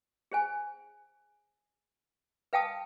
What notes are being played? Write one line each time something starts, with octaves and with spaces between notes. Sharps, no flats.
G#4 C5 G#5
B4 F5 G5 A5 D#6